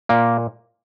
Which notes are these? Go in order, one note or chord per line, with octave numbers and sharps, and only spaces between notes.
A#2 A#3